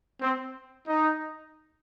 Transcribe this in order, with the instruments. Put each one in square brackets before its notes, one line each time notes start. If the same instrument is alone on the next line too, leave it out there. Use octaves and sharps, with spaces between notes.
[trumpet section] C4
D#4